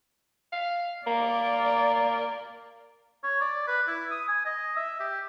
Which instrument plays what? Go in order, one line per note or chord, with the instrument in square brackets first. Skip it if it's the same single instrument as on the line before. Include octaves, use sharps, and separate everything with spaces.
[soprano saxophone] F5
[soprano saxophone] A#3 [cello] D5
[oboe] C#5
D5
B4
E4
D#6
G#5
D#5
E5
G4